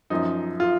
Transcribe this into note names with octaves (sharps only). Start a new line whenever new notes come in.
F#2 F3 D#4
F4